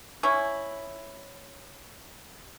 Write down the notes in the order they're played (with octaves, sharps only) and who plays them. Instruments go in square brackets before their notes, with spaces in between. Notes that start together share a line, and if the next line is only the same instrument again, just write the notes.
[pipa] C#4 E4